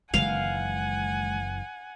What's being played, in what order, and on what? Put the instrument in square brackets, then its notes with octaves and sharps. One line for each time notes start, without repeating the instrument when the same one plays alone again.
[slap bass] F#1 B1 E3 [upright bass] D#3 G#3 [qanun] F5 [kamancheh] F#5 G#5